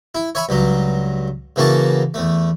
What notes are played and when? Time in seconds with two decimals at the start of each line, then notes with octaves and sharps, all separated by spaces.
0.15 E4
0.35 C#5 E5 G#5 B5
0.49 C#2 G2 F#3
1.56 C#3 E3 A#3 F#4 A5
2.14 E2 A3